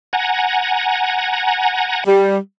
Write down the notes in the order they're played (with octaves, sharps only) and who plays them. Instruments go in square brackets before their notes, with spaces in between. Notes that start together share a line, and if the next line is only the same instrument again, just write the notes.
[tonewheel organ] F#5 G#5 A#5
[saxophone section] G3